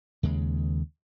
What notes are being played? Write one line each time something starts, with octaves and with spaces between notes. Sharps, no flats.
D#2 C#3 G#3